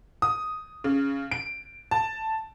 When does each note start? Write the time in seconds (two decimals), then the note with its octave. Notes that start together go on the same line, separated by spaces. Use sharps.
0.22 D#6
0.84 C#3
1.31 D7
1.91 A5